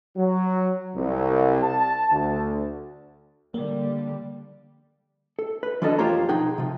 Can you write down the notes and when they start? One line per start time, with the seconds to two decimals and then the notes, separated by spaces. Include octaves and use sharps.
0.17 F#3
0.96 C2
1.63 A5
2.11 D2
3.54 D3 G3 A#3
5.39 A4
5.63 B4
5.82 E3 F#3 C#4 D4 A4 D#5
5.98 F2 F4 G4 C5 C#5 A#5
6.29 B1 F3 D#4 G#4 F#5 G5
6.58 C3 F3